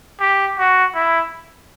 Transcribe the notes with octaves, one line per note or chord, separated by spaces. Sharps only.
G4
F#4
E4